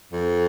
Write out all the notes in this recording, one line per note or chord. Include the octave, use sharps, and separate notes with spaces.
F2